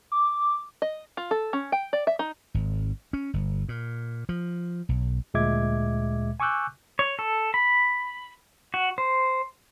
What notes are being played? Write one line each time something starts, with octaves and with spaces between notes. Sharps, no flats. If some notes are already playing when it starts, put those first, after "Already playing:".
D6
D#5
F4
A4
C#4
G5
D5
E5
D#4
G#1
C#4
G1
A#2
F3
B1
D2 A#2 G#3 E5 D6 G#6
G#5 C#6 D6 E6 F#6 G6
C#5
A4
B5
F#4
C5